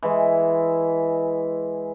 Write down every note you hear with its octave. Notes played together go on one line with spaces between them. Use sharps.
E3 G#3